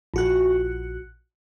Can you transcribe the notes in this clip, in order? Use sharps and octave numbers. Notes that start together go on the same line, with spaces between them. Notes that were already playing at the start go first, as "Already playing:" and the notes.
A#1 F#4 F#6